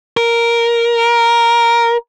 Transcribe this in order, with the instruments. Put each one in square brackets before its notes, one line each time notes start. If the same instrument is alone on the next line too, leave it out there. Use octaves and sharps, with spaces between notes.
[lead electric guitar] A#4